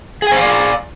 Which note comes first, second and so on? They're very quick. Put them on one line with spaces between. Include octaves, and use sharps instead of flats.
G#4 G#5 C5 F5 D5